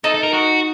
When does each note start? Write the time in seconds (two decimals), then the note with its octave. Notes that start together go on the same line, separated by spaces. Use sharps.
0.04 D#4 A4
0.14 A4
0.23 A#4
0.33 F#4